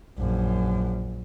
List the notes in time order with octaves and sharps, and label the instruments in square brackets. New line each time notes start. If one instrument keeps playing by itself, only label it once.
[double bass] A#1 F#2